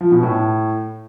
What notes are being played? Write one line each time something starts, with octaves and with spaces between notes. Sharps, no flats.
F3
B2
A2